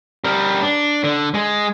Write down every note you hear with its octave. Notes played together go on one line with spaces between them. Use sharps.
G3 A#4
D4
D3
G#3